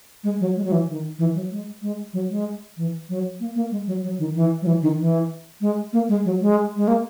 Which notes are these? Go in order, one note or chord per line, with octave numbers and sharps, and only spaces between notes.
G#3
F#3
G#3
F#3
E3
D#3
E3
F#3
G#3
G#3
F#3
G#3
E3
F#3
A#3
A#3
G#3
F#3
F#3
D#3
E3
F#3
E3
D#3
E3
G#3
A#3
G#3
F#3
G#3
G#3
A#3